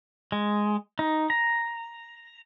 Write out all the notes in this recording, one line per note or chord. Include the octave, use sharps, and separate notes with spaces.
G#3
D#4
A#5